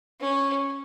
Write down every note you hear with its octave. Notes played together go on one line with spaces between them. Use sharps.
C#4